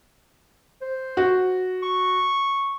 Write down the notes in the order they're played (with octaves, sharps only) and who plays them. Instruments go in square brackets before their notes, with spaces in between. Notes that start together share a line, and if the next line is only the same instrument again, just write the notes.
[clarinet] C5
[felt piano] F#4
[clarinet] C#6